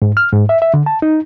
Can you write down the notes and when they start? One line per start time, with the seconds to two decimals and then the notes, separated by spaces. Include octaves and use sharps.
0.02 G#2
0.17 F6
0.32 G#2
0.49 E5
0.62 E5
0.74 D3
0.86 A5
1.02 D#4